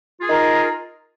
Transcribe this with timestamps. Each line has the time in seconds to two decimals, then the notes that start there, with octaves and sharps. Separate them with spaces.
0.19 F4
0.23 G#4
0.27 D#4
0.31 A#4